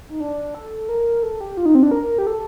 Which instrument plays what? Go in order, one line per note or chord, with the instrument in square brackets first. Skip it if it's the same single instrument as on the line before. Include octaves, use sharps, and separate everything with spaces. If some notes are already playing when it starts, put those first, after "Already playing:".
[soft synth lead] D#4
D4
A4
A#4
A4
G4
F4
D#4
C4
D4
A#4
G4
A4